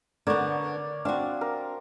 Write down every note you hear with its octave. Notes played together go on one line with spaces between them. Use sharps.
D3 B3 A#4 C#5 D5
C4 D4 F#4 F5
A#4